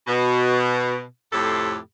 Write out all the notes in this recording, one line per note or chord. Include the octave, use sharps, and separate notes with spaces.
B2
F2 A2 C3 G4 A4